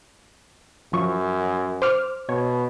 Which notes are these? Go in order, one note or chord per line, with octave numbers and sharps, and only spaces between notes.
F#2 F3 C#6
C5 D6 F6
B2 C#5